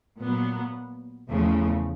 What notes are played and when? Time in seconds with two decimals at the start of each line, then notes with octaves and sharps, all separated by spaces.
0.21 A#2 F#3 B3
1.28 E2 C#3 F3 A3